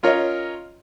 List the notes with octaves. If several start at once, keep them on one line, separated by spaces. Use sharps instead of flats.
C#4 F4 A#4 C#5 D#5